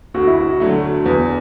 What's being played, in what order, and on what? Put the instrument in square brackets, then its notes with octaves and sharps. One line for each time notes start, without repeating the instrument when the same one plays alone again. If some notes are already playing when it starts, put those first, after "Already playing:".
[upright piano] D2 [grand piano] F#4
[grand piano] E4
F#4
[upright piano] D3 F#3 A3
[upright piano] E2 [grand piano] B4